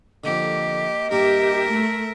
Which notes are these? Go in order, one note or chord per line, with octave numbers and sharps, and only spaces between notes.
F2 D3 A#3 G4 D#5
G2 A#3 G4 A#4 E5
A3